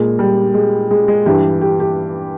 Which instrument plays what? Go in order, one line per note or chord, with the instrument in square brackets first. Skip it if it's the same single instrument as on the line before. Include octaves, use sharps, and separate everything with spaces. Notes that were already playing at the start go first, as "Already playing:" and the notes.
Already playing: [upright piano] A#2 G#3
G3
G#3
G#3
G#3
G2 E3 G4
G4
G4